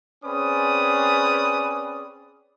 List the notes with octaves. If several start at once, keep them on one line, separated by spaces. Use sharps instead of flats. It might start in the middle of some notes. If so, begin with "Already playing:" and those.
C4 C#4 G#4 B4 D5 D#6